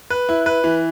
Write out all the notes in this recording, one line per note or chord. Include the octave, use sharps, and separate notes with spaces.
B4
E4
B4
E3